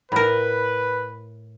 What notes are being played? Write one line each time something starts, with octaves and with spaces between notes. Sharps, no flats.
A2 A#4 B4 B5